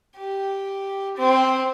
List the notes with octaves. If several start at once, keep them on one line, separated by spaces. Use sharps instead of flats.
G4
C4